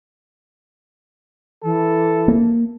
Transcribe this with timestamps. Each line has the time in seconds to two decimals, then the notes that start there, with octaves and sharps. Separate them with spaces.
1.63 E3 A4
2.28 A#3